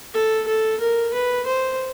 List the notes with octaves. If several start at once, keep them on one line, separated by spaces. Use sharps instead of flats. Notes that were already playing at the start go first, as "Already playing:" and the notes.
A4
A4
A#4
B4
C5